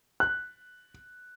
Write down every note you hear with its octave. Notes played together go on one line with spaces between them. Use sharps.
F#6